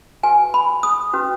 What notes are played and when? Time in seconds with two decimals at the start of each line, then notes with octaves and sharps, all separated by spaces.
0.23 F#4 B4 G#5
0.54 B5
0.83 D#6
1.13 C#4 F#4 B4